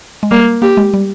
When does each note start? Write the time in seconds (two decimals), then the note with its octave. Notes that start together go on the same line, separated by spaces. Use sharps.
0.23 G#3
0.31 G3 A#3
0.62 A#3 G4
0.77 G#3
0.94 G3